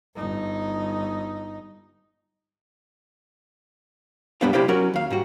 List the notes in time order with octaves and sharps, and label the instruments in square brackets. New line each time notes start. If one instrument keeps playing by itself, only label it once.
[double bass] G1 D#4
[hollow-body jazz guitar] B1 F#2 G3 B3 D4 F5
C3 E4 G4 C5 D5 F5
F#3 C#4 F#4 A#4
D#2 F5
G#2 G3 F#4